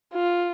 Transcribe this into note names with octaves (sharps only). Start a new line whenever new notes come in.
F4